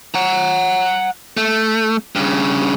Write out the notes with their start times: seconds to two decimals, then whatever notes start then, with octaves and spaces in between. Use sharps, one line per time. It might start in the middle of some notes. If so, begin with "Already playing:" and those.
0.15 F#5 A#5
1.37 A3
2.15 G2 C#3